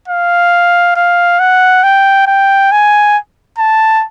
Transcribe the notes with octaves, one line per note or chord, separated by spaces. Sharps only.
F5
F5
F#5
G5
G5
G#5
A5